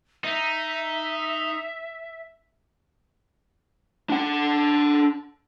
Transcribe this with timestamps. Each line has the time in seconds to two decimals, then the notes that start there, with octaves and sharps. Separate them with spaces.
0.25 D#4 E5
4.10 D4 F#5